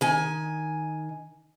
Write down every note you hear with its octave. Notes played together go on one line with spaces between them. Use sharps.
D#3 G#5